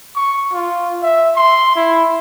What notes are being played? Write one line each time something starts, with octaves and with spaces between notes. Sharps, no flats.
C#6
F4
E5
C6
E4